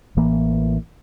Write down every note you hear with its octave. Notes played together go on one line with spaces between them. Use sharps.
A1 E3 A#3